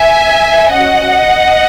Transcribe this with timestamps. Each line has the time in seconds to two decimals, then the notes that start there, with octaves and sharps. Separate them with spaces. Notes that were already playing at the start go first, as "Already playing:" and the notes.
Already playing: E5 G#5
0.71 C#4 F#4 D#5 F#5